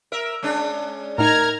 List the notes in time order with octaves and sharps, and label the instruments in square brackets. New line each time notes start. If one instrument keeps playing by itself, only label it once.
[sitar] A#4 E5
G#3 C#4 D4
[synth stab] A2 D#4 [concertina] A#4 [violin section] A#5 F6 G#6